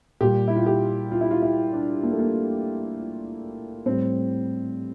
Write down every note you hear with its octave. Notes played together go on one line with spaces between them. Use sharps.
A#2 G3 G4
E4
F4
G4
F4
E4
F4
E4
D4
A#3
A3
A#3
A2 G3 C4